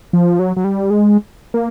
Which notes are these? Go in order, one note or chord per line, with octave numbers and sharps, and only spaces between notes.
F3
F#3
F#3
G3
G#3
A#3